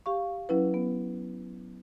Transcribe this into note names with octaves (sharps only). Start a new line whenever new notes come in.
G4 F5 C#6
F#3 C#4 E4 B4
B3